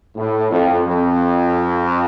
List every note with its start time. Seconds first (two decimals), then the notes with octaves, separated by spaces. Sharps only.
0.15 A2
0.50 F2
0.86 F2